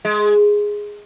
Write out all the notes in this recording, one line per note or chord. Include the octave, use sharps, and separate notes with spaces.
G#3